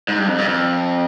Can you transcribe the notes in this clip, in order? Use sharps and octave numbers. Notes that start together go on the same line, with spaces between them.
G#2
G2
F2
G2
F2